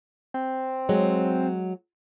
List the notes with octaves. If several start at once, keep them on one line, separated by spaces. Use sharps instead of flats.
C4
F#3 G#3